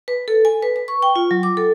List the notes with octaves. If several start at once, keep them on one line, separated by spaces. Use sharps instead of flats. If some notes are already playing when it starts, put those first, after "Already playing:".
B4
A4
G#5
B4
B4
C#6
G5
F4
F#3
D6
A4